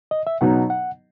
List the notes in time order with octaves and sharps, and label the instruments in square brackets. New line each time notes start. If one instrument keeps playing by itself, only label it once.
[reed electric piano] D#5
E5
[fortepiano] B2 F#3 B3 D#4 [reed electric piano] F#5
[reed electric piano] F#5